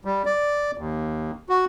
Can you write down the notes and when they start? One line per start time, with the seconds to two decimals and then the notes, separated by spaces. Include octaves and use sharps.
0.05 G3
0.25 D5
0.78 D#2
1.49 F#4